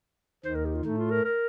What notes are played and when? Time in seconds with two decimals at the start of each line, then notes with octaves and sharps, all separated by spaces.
0.45 D#2 D#3 C5
0.55 A#4
0.65 G4
0.75 F4
0.84 A2 A3 D#4
0.98 F4
1.11 A#4
1.25 A#4